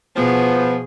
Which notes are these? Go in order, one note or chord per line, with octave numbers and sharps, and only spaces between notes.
B2 F3 B3 G#4